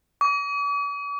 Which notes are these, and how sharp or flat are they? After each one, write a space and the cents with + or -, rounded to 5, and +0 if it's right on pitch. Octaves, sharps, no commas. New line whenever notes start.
D6 -45